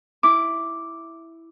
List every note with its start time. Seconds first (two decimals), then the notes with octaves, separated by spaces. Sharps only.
0.23 E4 D6